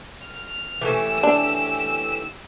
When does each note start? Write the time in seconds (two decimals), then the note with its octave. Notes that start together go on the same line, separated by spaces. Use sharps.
0.22 F6
0.81 E3 A3 C#4 G4 E6
1.23 D4